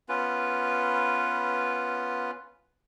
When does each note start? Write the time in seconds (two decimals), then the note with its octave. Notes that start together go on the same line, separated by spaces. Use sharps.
0.09 B3 C#4 F4 B4